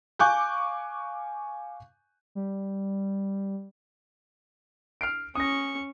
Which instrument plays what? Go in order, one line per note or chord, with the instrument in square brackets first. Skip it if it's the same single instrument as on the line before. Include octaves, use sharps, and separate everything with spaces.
[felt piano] F5 G#5 C#6 D6 F#6 G6
[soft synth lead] G3
[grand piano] F6 C7 D7
[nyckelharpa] C#4 C#6 [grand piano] D#6 A#6